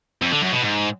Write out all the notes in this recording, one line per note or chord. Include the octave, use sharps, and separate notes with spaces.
F2
D3
F#2
B2
G#2